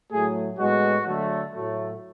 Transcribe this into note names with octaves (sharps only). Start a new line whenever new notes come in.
A2 F#3 A3 G#4
A2 G#3 B3 F#4
D3 F#3 A3
A2 F#3 A3